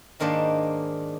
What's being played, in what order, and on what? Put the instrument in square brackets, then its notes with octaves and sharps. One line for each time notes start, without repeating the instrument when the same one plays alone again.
[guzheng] G#2 D#3 A#3 D4 C5